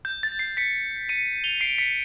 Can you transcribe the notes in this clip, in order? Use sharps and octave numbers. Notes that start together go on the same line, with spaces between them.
G6
A6
C7
B6 C#7
C#7 D#7
F7 G7
C7 D7
B6 C#7